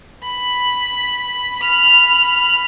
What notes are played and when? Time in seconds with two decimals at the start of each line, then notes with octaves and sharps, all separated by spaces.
0.24 B5
1.59 B5 F6